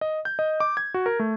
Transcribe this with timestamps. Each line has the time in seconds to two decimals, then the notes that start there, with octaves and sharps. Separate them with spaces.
0.01 D#5
0.25 G6
0.39 D#5
0.60 D6
0.77 G#6
0.94 F#4
1.06 A#4
1.19 A3